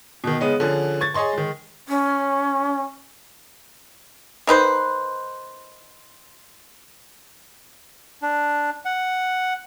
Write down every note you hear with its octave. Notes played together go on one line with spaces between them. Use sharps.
B2 D#3
C#3 G#3 B3 C#4 D#4
D3 F3 C#4 G#4
C#6 G#6 A6
G#4 C#5 D#5 C6 C#6
D#3 G#3
C#4
D#3 D#4 B4 C5
D4
F#5